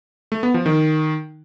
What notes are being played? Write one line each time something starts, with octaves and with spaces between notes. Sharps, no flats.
A3
B3
F3
D#3